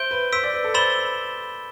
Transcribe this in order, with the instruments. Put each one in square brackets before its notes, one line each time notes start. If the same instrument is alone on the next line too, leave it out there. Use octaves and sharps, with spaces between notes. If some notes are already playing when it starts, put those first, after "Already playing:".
Already playing: [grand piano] C5 E5 [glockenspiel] G6 D7 G7
[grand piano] B4
[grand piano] C5 [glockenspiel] E6 B6 D7
[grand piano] D5
B4
A4
[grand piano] C5 [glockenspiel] B5 E6 A6 E7 G7